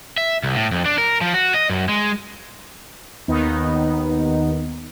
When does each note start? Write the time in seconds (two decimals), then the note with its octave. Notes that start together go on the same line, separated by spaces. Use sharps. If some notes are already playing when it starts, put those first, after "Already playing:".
0.18 E5
0.43 C2
0.55 A2
0.71 F2
0.85 D4
0.98 A#4
1.21 F3
1.34 F#4
1.54 D#5
1.70 F#2
1.89 G#3
3.28 D#2 D#3 B3 D#4